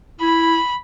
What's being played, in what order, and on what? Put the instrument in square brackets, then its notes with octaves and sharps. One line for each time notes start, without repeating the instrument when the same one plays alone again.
[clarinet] E4 [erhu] B5